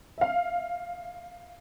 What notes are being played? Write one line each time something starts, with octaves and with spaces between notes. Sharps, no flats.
E5 F5